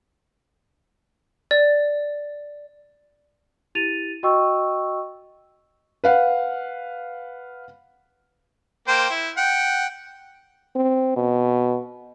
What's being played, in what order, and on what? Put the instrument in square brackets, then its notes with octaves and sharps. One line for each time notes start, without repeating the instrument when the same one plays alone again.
[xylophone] D5
[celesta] E4 G4 A6 D#7 F7
F#4 D#5 G5 C#6 E6
[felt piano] B4 F5 F#5
[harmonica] A#3 C5 G5
E4
F#5 G5
[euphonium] C4
B2